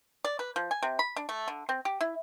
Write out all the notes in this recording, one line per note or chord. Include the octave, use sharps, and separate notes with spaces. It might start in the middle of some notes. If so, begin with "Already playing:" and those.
D5
B4
F3
G#5
C3
B5
D4
A3
D3
C4
G4
E4